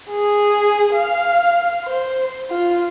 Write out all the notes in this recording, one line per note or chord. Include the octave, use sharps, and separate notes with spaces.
G#4
F5
C5
F4